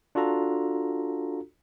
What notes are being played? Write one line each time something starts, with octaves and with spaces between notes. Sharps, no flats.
D4 F4 F#4 A4 A#5